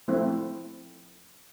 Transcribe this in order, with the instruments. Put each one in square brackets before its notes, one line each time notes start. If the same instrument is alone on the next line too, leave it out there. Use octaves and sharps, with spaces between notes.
[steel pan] F3 A3 C4 E4